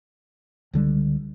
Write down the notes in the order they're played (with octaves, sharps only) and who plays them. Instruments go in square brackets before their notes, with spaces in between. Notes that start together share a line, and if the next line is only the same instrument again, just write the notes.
[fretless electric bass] C#2 D3 G3